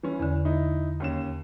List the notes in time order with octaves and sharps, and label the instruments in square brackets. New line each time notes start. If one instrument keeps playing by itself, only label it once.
[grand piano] E3 C#4
[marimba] E2 D3
[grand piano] D#4 E4
D#2 C#4 E7